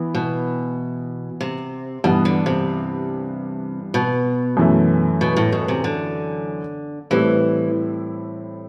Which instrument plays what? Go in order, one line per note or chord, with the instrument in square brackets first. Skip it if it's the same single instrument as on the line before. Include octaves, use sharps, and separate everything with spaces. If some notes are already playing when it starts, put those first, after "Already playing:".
Already playing: [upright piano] E3 B3 E4
[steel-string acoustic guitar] B2
C3
[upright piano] G2 E3 B3 [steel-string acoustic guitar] B2
[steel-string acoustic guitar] D3
C3
B2
[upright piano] F#2 E3 A3
[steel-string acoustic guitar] B2
A2
B2
C3
D3
[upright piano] A2 G3 C4 E4 [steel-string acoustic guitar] E3